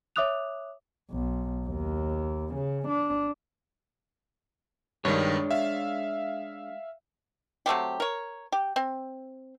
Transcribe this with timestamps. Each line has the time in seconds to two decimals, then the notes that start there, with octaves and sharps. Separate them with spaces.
0.16 C#5 E5 D6 D#6 F#6 F7
1.12 B1
1.67 D#2
2.54 C#3
2.89 D4
5.05 G2 D#3 G#3 D4 C#5
5.51 E5 F5
7.66 F#3 A3 C4 G4
8.00 A#4 C#5
8.52 G4
8.76 C4